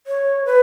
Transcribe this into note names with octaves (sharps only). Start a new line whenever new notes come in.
C#5
B4